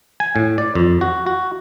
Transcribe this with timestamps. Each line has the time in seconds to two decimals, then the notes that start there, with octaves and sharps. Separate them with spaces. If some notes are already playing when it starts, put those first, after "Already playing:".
0.20 G#5
0.36 A2
0.58 D5
0.75 F2
1.01 F#4
1.26 F#4